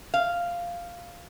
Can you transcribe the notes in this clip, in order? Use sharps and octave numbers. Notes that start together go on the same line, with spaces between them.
F5